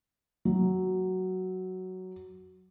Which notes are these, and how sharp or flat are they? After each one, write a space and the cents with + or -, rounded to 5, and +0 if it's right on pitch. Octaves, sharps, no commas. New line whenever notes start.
F#3 +5